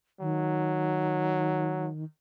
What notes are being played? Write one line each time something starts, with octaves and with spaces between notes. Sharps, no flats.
D#3 F#3